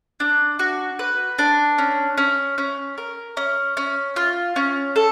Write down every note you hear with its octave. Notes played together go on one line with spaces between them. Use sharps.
D4
F#4
B4
D4
C#4
C#4
C#4
A#4
C#4
C#4
F4
C#4
A4